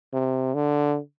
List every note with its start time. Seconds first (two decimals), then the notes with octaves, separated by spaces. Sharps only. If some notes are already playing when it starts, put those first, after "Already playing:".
0.13 C3
0.55 D3